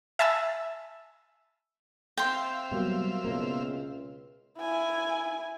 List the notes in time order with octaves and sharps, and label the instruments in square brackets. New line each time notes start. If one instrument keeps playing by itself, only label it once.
[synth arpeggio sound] E5 G#5 A5 B5 E6
[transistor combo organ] C4 E5 F5 [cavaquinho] G5 C6
[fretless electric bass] B2 G3 A#3 [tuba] F#3
[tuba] C#2 [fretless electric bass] B2 A#3
[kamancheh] E4 G#5